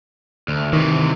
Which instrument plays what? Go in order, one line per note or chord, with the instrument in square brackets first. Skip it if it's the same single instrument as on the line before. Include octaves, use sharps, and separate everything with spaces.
[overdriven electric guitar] D2
[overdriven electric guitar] C3 E3 [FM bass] D#3